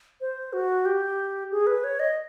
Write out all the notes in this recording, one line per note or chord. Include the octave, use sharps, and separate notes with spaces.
C5
F#4
G4
G#4
B4
C#5
D#5